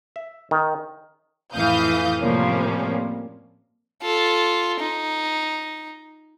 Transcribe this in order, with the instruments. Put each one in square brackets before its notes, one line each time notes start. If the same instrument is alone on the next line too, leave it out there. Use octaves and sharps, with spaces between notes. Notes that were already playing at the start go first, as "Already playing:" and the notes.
[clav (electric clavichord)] E5
D#3
[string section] F2 A2 E3 F5 D#6 G6
A2 C3 F3 G3 A#3 C#4
[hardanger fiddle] F4 A4
D#4